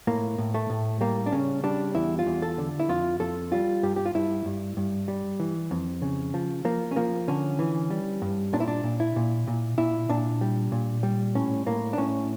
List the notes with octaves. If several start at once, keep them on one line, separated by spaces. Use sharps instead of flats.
A2 A#3
A2
A3
A2
G3 A#3
D4
C#3 C#4
G3 D4
E2 E4
F4
E2
A4
D3
E4
F2 F4
F2 A4
G3 F4
G2 G4
G4
F4
G2 E4
G2
G2
G3
E3
F2
C#3
F3
F3 A#3
C#4
F3 A#3
D3 C#4
E3
G3
G2
A#2 D4
E4
D4
A#2
E4
A#2
A#2
A#2 E4
A#2 D4
G3
A#2
G3
A2 C#4
A2 A#3
D4
A2 C#4